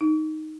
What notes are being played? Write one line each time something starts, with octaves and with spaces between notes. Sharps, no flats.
D#4